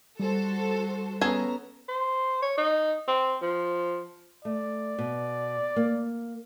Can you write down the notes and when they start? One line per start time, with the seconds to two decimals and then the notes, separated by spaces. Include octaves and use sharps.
0.20 G3 F#4 A4 C5
1.21 B3 C#4 G#4 A4 G#5 A#5
1.89 C5
2.42 C#5
2.58 D#4
3.08 C4
3.42 F3
4.45 A3 D5
4.99 B2
5.76 A#3